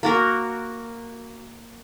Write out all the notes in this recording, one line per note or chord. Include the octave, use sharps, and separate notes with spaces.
A#3 F#4 A#4